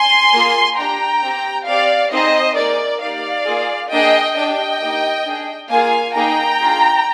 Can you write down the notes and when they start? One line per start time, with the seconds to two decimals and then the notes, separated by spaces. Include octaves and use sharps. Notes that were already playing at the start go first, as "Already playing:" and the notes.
Already playing: G#5 C6
0.33 A#3 F4 G#4
0.78 D4 G4 G5 A#5
1.23 C4 G4
1.68 C4 G4 D5 F5
2.12 C4 D#4 G#4 C5 D#5
2.57 A#3 D#4 G#4 A#4 D5
3.02 A#3 D#4 G4 D5 F5
3.47 A#3 F4 G#4
3.91 A#3 D4 G#4 D#5 G5
4.37 D4 G4 D#5 G5
4.81 A#3 D#4 G4
5.26 D4 G#4
5.71 A#3 F4 G#4 F5 G#5
6.16 A#3 D#4 G#4 G5 A#5
6.61 D4 F4 G#4